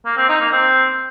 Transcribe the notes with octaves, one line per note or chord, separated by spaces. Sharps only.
A#3
C4
D#4
A#3
C4